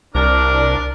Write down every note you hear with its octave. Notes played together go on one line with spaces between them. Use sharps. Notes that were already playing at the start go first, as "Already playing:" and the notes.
C2 D4 A#4 D5